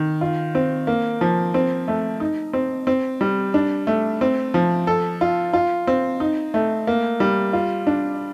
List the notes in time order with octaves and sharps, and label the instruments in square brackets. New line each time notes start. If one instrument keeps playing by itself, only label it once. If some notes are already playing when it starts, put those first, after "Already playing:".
Already playing: [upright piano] D#3
F4
C4
A#3
F3
C4
A3
D#4
C4
C4
G3
D4
A3
C4
F3
A4
F4
F4
C4
D#4
A3
A#3
G3
F4
D4